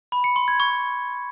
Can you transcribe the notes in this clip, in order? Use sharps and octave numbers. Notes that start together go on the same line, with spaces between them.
B5
C#7
C6
G#6
C#6